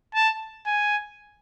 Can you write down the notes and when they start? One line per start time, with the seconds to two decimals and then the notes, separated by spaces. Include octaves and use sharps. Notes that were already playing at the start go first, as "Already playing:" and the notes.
0.15 A5
0.66 G#5